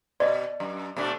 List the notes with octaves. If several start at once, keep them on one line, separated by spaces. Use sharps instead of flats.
B2 D5 D#5
F#2
B2 A3 D4